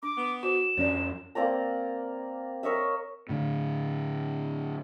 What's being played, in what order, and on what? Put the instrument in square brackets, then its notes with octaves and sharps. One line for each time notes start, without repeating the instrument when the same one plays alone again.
[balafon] D4 [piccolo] D6
[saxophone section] B3
[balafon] F#4 C5 [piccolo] E7
[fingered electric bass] F2 C#4 [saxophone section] E3 F3 D4 [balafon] C#5 D5
[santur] A#3 C4 D5 A#5
A#4 C#5 D#5 E5
[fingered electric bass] A2 D3